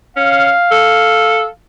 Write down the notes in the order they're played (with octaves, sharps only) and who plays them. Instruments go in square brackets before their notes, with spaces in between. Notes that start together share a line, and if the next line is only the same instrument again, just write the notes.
[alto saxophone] C#4 [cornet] F5
[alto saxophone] A4